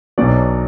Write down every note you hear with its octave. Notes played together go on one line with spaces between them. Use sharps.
B1 B2 F#3 D5